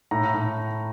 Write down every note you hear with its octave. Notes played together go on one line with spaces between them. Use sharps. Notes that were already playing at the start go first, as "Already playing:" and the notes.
A2 A#5
A2